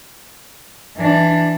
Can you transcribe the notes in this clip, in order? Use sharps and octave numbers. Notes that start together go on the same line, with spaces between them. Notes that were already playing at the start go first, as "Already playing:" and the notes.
E3 D4